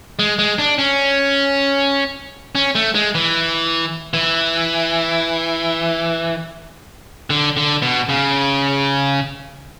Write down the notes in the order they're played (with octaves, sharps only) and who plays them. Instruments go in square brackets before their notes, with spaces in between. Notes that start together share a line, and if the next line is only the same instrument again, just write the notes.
[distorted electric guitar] G#3
G#3
D4
C#4
C#4
A3
G#3
E3
E3
D3
D3
B2
C#3